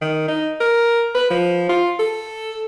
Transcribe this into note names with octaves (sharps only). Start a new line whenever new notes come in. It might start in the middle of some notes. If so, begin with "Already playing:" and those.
D#3
D#4
A#4
B4
F3
F4
A4